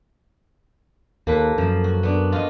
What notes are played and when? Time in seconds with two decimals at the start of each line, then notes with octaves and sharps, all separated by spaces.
1.27 D#2 A#3 A4 B4
1.58 F#2 F3
1.84 F#4
2.03 B3 D4
2.32 F4 F#4 D#5